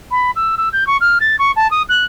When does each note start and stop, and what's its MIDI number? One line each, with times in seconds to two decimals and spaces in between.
0.11 0.31 83
0.36 0.55 88
0.57 0.69 88
0.73 0.87 91
0.87 0.97 85
1.01 1.18 89
1.20 1.36 93
1.39 1.51 85
1.56 1.70 81
1.71 1.82 87
1.89 2.05 90